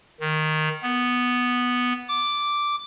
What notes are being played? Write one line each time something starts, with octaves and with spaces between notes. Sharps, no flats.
D#3
B3
D6